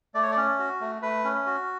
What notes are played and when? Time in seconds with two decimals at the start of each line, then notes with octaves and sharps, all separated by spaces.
0.14 A3 D5
0.23 C#5
0.32 D5
0.37 C#4
0.59 F#4
0.81 A3
1.02 A3 B4
1.24 C#4
1.46 F#4